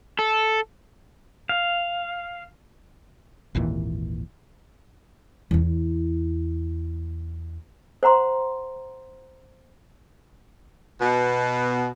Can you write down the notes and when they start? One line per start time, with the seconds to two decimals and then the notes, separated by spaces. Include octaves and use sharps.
0.19 A4
1.49 F5
3.55 G#1 D#2 A#2 E3
5.51 E2 E4
8.03 C5 F#5 A#5 C6
11.01 B2